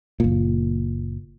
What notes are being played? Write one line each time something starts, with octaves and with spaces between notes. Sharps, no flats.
F#1 A#2